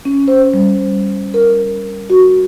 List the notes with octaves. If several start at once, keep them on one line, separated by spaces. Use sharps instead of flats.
C#4
C5
G3
A#4
F#4